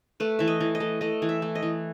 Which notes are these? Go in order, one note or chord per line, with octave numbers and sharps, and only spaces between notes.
A3 B4
E3 E5
D#5
E3
D#5
A3
A3 D#5
E3
E5
A3
D#5
E3